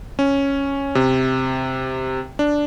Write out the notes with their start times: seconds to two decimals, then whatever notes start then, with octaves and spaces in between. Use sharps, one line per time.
0.19 C#4
0.95 C3
2.39 D4